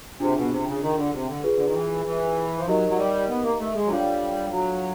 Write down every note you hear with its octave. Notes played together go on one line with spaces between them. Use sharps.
C3 D4 F4 G#4
B2
C3
C#3
D#3
D3
C3
D3
F4 G#4 B4
D3
D#3
E3
E3
F3
F#3 D#4 G4 A#4 D#5
F#3
G3
B3
A#3
A3
G#3
F#3
G3 D4 F4 A4 C#5 F5
F#3